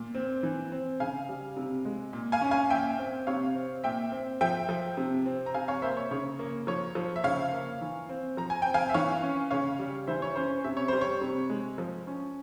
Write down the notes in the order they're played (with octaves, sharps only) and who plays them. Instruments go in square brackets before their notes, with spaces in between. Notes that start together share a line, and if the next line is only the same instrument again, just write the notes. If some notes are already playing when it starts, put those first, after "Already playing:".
Already playing: [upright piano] A#2
C4
E3
C4
C#3 F5 G#5
G3
C3
G#3
A#2
F5 G#5
C#4
F5 G#5
A#2 E5 G5
C4
C3 C#5 F5
C4
A#2 E5 G5
C4
F3 E5 G5
F3
C3
C4
A#5
C3 F5 G#5
C#5 F5
A#3 C5 E5
C#5
C#3 C#5
A#3
F3 C#5
F3
E5
C#3 C#5 F5
A#3
E3
C4
F3 A#5
G#5
C4 G5
F5 G#5
E5
E3 C#5 F5
C#4
C#3 C#5 F5
G3
E3 C5 E5
C#5
C#4 C5
C5
C3 E5
C#5
G3 C5
C#5
C3
G#3
F3
C#4